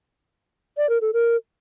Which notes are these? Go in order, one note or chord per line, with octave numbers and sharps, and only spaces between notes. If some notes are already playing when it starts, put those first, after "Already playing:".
D5
A#4
A4
A#4